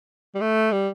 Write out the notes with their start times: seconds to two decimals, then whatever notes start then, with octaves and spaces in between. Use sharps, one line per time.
0.35 G3
0.41 A3
0.72 G3